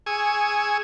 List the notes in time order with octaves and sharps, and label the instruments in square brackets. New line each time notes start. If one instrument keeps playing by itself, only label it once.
[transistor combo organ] G#4 G#5 C#6 D#6 E6